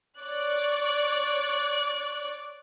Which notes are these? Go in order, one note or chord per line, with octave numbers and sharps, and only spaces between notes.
C#5 D5 F#6